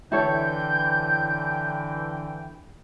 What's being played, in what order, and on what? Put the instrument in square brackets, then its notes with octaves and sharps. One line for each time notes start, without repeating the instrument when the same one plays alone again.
[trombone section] D3 E3 [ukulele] E4 A4 C#5 [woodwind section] G5 [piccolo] G6